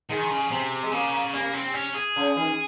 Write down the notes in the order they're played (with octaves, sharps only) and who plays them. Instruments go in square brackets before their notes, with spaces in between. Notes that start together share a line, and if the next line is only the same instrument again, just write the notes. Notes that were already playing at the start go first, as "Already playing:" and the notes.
[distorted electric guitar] D#3 [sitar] G#3
[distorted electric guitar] C#3
[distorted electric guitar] C3 [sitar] C4
[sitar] G#3
[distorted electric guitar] C#3 [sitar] A#3
[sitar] C3 [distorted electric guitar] A#3
[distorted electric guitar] C4
C#4
G#4
[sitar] C#3
D#3